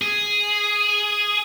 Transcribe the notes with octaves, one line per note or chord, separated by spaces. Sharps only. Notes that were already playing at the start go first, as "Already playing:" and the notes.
G#4